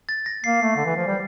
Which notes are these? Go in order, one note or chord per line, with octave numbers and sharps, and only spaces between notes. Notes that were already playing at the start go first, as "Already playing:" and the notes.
A6
A#6
A#3 C7
A3
D3
E3
F3
G3